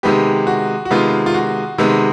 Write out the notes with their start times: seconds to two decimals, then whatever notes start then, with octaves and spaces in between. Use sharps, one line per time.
0.03 C3 D#3 G#3 B3 G4
0.47 F#4
0.85 F#4
0.91 C3 D#3 G#3 B3 F4
1.26 F4
1.34 F#4
1.78 C3 D#3 G#3 B3